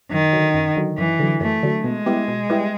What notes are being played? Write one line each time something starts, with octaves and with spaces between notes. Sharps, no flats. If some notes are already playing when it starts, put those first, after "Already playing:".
F#2 D#3
D3 F#3
F#2
D3 F#3
F#2 E3
D3 F#3
F#2 A3
D3 F#3
B2 G#3
G3 B3 E4 G4
B2
G3 B3 E4 G4